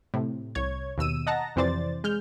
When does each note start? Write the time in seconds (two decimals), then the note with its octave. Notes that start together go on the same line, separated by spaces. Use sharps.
0.14 A2 C3
0.55 C2 C#5 G#6
0.98 D#2 B2 E6 D#7
1.27 D#5 F#5 A5 A#5 A#6
1.56 F2 C3 E3 C5 D5 A6
2.04 G#3 F6 G6